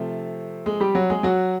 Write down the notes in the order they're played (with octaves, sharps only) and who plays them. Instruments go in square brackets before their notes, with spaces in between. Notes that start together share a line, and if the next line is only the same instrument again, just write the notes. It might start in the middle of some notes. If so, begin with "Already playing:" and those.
Already playing: [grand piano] C3 F3 A3
G#3 G#4
G3 G4
F#3 F#4
G#3 G#4
F#3 F#4